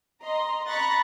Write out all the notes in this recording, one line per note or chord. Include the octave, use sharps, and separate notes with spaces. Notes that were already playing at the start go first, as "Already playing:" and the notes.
D#5 A#5 C6
A#5 B5 C#6 F#6 A6 A#6